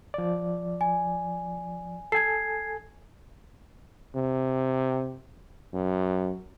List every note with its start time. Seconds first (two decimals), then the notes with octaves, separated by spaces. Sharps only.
0.14 F3 D5
0.81 G#5
2.12 A4 G#5 G#6 C7
4.15 C3
5.73 F#2